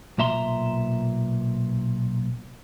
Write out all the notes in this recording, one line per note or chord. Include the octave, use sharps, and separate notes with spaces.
B1 A#2 E5 A#5 C6